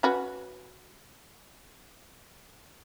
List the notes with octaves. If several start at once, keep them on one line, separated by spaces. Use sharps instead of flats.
C#4 F#4 B4